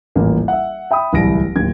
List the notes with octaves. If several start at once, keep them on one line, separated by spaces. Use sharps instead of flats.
D#1 A1 E3 A#3
E5 F#5
E5 G5 B5 D#6
D1 C2 E3 E4 A#6 D7
D1 D#2 G#6